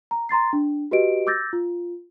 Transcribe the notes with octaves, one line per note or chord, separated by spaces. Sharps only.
A#5
A#5 C6 A6 C7
D4
F#4 G4 B4 D#5 D7
D6 E6 G6 A6 A#6
F4